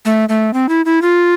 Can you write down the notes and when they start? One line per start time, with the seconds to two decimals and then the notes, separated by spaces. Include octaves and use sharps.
0.05 A3
0.29 A3
0.53 C4
0.69 E4
0.85 E4
1.02 F4